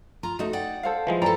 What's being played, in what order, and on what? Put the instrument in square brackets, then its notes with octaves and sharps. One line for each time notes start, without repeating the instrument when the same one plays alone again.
[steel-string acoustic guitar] F4 A#5
[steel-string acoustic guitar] A3 F#4 [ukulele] D#4 D#5
[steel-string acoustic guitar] D5 F#5 G5
[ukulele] A4 C5 F5
[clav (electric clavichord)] E3 F3 G#3
[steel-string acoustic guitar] E4 A4 [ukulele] D5 G5 A#5